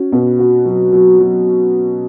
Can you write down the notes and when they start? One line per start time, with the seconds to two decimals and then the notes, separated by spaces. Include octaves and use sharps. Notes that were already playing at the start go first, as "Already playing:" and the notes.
Already playing: C#4 F#4
0.12 B2
0.39 F#4
0.66 F#3
0.93 F#3
1.19 F#3